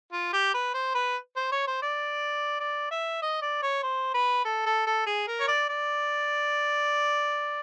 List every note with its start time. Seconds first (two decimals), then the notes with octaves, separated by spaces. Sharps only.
0.13 F4
0.33 G4
0.54 B4
0.74 C5
0.95 B4
1.36 C5
1.52 C#5
1.67 C5
1.82 D5
2.60 D5
2.91 E5
3.22 D#5
3.42 D5
3.63 C#5
3.83 C5
4.14 B4
4.45 A4
4.66 A4
4.87 A4
5.07 G#4
5.28 A#4
5.40 C#5
5.48 D5
5.69 D5